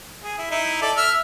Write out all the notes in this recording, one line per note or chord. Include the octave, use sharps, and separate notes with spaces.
G#4
E4
D#4 E4
A4 D5
E5 E6 F6